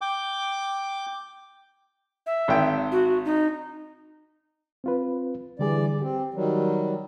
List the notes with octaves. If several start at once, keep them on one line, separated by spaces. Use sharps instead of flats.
G5 D6
E5
G#1 G5
F#4
D#4
C4 F4 B4
D3 E3 G3 G#4 D5
C4 G4
D#3 F#3 G3